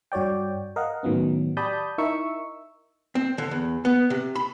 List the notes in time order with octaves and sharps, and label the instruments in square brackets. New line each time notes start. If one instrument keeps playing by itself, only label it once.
[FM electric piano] G2 F#4 C#5 D5 G5
A#4 D#5 F5 F#5
A2 D#3 F#3 B3 C#4
G4 D5 A5 B5 D#6 G6
D#4 E4 A#4 E5 C#6 E6
[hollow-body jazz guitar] C4
D3
E2
B3
C3
B5